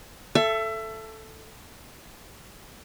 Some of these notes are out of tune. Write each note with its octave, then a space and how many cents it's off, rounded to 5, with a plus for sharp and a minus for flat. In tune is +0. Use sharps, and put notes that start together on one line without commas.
A4 +0 E5 +25